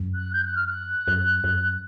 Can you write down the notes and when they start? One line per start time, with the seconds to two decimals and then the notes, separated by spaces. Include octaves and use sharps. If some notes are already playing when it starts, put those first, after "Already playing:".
Already playing: F#2
0.15 F#6
0.34 G6
0.45 F#6
0.56 F6
0.68 F#6
1.07 F#2
1.44 F#2